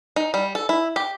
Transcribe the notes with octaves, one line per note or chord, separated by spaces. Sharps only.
D#4
G3
A4
E4
G4